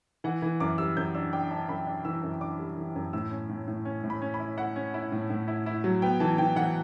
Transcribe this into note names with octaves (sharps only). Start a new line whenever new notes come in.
E3 F#5
E3
F#2 D6
G3 E6
F#2 G6
D4 E6
D4 G5
D4 A5
F#2 B5
D4
E3 E6
F#2
D4 D6
G3
E3
F#2
A2 E6
C#4
A2
A2
C#4
A2
B5
C#4
B5
E4
E4 F#5
C#4
E4
A2
A2
E4
E4
F#3
B3 G5
E3 A5
E3 G5
E3 F#5